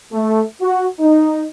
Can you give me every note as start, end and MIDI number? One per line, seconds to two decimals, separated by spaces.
0.12 0.42 57
0.61 0.85 66
1.00 1.44 63